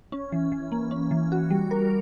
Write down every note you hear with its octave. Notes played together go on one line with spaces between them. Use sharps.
C#4
E3
E3
A#3
C#4
E3
F#4
G3
A#4